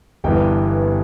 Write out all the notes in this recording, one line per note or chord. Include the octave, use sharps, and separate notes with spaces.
G1 G2 E3 B3 G5